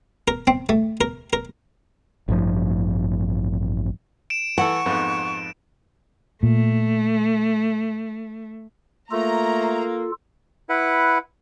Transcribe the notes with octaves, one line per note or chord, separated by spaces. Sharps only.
A#4
C4
A3
A#4
A#4
A1 G2 F3
D7 E7
E3 A4 F#5 C#6
F2 G#2 B3
A#2 A3
A3 A#3 F4 A4 A#5
E4 B4 F#5